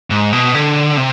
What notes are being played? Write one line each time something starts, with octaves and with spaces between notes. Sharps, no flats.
G#2
B2
D3
C3